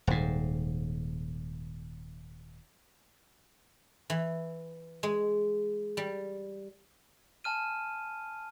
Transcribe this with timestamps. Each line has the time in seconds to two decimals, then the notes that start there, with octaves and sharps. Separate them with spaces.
0.07 D#1 G#2
4.10 E3
5.03 G#3
5.97 G3
7.44 G#5 A5 F6 D#7